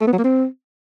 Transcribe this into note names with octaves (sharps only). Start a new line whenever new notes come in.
A3
B3
F#3
A#3
C4